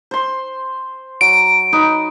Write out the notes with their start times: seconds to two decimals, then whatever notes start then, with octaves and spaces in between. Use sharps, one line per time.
0.11 C5 C6
1.21 F#3 D7
1.73 D#4 B4 D#5